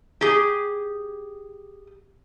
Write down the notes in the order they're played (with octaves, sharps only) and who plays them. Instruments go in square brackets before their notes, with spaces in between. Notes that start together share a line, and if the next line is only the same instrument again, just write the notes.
[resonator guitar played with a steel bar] G4 G#4